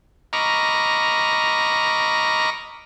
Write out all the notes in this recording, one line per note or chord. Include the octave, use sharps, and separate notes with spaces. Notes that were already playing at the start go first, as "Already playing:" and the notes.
D#5 A#5 B5 C#6 D6 F6